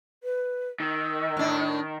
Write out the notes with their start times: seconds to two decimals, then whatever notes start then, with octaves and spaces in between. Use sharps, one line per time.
0.24 B4
0.80 D#3 E6
1.37 A2 D4